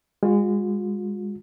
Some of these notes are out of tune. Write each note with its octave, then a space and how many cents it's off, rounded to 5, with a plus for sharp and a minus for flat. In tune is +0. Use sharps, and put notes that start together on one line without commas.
G#3 -30 F4 +45